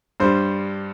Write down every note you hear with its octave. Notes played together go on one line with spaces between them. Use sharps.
G2 G3 C5